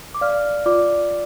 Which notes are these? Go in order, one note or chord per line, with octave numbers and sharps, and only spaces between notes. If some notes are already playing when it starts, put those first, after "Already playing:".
D6
D5 F5 F6
F4 D5 D6